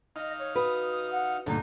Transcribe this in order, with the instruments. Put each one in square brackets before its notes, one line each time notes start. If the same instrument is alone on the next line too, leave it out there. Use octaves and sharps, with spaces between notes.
[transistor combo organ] D#4 F5 [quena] D#5
[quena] C#5
[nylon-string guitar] F#4 B4 [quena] D#6
[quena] D#6
F#5
[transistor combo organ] G2 A3 [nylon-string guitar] A#2 D3 [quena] D#4